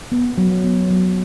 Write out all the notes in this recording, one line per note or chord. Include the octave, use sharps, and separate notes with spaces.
B3
F#3
B3
F#3